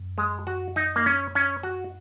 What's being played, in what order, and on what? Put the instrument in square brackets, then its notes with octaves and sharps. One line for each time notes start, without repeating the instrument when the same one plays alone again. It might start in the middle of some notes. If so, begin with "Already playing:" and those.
Already playing: [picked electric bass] F#2
[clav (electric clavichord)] G#3
F#4
D#4
A#3
C#4
C#4
F#4